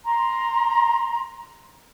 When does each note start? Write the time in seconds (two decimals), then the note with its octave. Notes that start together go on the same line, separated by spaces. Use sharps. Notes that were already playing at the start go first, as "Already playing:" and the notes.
0.06 A#5 C6